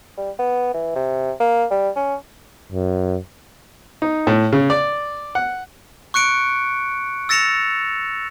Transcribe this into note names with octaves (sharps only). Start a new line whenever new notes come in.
G3
B3
E3
C3
A#3
G3
C#4
F#2
D#4
A2
C#3
D5
F#5
C#6 F#6 C#7 D7
E6 A6 A#6 C#7 E7 F7